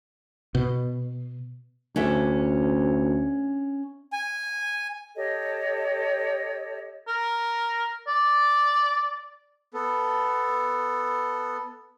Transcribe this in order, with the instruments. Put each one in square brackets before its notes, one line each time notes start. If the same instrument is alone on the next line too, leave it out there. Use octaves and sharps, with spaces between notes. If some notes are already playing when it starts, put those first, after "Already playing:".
[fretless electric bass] B2
[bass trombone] D2 [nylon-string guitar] C#4 D4 E5
[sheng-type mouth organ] G#5
[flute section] G4 A4 C#5 D#5
[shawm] A#4
D5
[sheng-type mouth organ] B3 A4